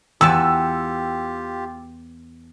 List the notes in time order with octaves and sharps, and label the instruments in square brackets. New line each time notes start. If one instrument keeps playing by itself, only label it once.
[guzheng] E2 B4 A5 [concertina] F4 G4 [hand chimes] G5 [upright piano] E6